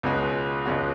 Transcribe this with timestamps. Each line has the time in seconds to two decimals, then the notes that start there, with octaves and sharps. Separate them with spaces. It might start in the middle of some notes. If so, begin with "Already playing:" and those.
0.03 C#2 B2 G#3 C#4 F#4
0.66 C#2 B2 G#3 C#4 F#4